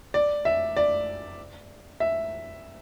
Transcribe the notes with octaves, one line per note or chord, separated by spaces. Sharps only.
D5
E5
D5
E5